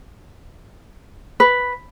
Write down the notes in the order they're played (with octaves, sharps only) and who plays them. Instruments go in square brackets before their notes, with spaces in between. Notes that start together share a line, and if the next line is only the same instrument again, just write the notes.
[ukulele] B4